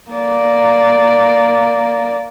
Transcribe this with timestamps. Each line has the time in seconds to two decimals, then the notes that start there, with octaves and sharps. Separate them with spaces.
0.10 A#3 D5